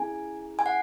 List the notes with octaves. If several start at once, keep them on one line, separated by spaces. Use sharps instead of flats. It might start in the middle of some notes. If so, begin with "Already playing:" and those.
Already playing: C#4 E4 G#4 G#5
G#5
F#5